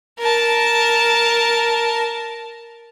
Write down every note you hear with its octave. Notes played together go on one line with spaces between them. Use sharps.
A#4 A5